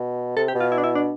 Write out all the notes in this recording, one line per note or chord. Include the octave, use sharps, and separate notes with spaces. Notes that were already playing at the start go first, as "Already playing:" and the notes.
Already playing: B2
C3 A4
G4
B2
F4
E4
D4
E4
D4